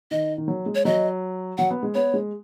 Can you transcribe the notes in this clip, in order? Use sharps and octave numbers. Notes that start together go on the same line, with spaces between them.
D#3 D#5
D#3
F#3
G#3
C#5
F#3 D#5
F#3 F#5
B3
G#3
B3 C#5
G#3